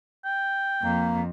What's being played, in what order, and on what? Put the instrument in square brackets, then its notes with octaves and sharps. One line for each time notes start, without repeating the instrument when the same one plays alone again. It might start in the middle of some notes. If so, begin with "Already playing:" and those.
[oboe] G5
[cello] F2 [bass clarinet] A#3